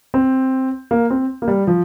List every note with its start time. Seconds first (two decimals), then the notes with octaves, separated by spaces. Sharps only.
0.14 C4
0.91 A#3
1.10 C4
1.42 A#3
1.48 G3
1.67 F3